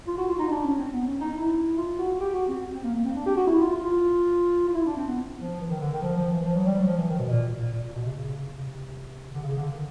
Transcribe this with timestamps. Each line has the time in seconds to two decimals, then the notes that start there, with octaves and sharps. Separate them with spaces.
0.07 F4
0.18 F#4
0.28 F4
0.39 D#4
0.50 D4
0.64 C#4
0.78 C4
0.92 B3
1.07 C#4
1.20 D#4
1.35 E4
1.77 F4
1.99 F#4
2.20 G4
2.34 F#4
2.48 C4
2.73 C4
2.83 A#3
2.94 A#3
3.05 C4
3.15 D4
3.26 G4
3.37 F#4
3.47 E4
3.61 F4
3.76 F4
4.68 F4
4.75 E4
4.86 D4
4.96 C4
5.07 B3
5.39 F3
5.60 E3
5.70 D#3
5.81 D3
5.92 D#3
6.02 F3
6.17 F3
6.30 E3
6.44 F3
6.55 F#3
6.66 G3
6.77 F#3
6.87 F3
6.98 E3
7.08 D#3
7.19 B2
7.30 A#2
7.58 A#2
7.72 A#2
7.83 A#2
7.93 B2
8.04 C3
8.15 C#3
8.57 C3
9.32 D3
9.42 C#3
9.57 D3
9.71 D#3